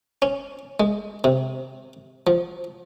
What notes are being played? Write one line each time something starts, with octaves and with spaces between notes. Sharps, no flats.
C#4
G#3
C3
F3